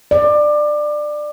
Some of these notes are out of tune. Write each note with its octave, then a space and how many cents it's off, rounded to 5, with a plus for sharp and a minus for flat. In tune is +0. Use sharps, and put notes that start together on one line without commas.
D5 +20